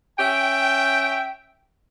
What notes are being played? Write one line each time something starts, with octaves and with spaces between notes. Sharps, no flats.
C#4 E5 G5